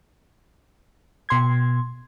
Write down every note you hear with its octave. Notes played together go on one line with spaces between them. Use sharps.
B2 C6 G#6